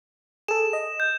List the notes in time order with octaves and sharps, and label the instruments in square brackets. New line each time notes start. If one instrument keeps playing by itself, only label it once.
[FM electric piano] G#4 A4 [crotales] E7
[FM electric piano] D#5
[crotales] G6